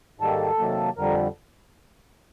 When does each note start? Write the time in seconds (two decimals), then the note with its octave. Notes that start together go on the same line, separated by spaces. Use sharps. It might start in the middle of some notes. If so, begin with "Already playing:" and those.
0.20 G#2 D#3 G3 A#3 A4
0.59 C3 D#3 F#3 A#3
0.97 F2 D3 G3 A#4